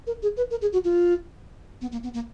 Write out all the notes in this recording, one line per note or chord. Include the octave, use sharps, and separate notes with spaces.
A#4
G#4
B4
A#4
G#4
F#4
F4
B3
A#3
B3
A#3